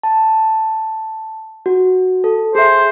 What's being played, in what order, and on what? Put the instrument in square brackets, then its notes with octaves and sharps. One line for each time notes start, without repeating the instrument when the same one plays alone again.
[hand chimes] A5
F#4
A4
[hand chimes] G#4 E5 [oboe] C5